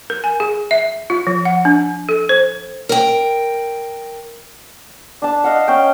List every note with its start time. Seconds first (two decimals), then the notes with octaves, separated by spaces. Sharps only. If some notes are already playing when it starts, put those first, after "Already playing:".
0.10 A#4
0.24 G#5
0.40 G#4
0.71 E5
1.10 F4
1.27 F3
1.45 F#5
1.65 D4
2.09 A4
2.29 C5
2.89 A#4 G5
5.22 D4 A5
5.44 D#5 F5 F#5
5.68 C#4 C#5 G5